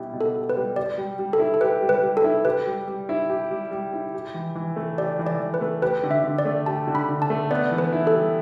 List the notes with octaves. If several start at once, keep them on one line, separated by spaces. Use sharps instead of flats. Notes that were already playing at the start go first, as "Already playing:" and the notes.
Already playing: B2 G3 E4 G4
B2
A4
G4
B4
G3
G4 D5
G3
G3
A4
E4
A4
G4 B4
G3
B4
G3
A4
E4
G4 B4
G3
G3
E4
G4
G3
G3
E4
G4
E3
E3
A3
G4 D5
E3
D5
E3
B4
A3
G4 B4
D3
E5
D3
D5
A3
G4 A5
D3
B5
D3
A5
A3
B3 D5
E3
B4
E4
A4
G3